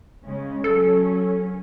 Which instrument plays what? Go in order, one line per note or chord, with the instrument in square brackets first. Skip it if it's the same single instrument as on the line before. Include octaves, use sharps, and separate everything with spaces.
[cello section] C#3 G#3 C#4
[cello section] F#3 C#4 [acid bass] A4